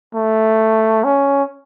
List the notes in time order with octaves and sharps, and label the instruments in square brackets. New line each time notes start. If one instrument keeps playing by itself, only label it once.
[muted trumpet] A3
C#4